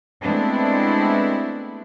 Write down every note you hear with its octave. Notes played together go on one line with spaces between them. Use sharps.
G#3 A3 B3 C4 D4 E4